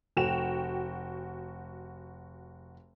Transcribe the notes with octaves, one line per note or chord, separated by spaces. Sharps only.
F1 F#4 G5 E7 F7